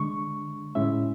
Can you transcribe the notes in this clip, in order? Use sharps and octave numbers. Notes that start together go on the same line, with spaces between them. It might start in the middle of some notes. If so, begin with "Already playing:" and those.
Already playing: D3 G#3 D4 C#6
A2 G#3 C#4 E4 E5